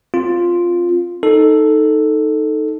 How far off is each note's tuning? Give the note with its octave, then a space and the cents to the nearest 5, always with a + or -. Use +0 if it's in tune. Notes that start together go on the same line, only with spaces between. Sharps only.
C4 +15 F4 +0
D#4 +0 A4 +0